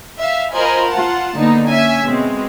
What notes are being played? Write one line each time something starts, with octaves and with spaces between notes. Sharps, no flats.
E5 F5
F4 A#4 C5 D#5 G#5 B5
F4 F#5 A5
D3 A#3 B3 D#4
C#4 E5 G#5
B2 G#3 C4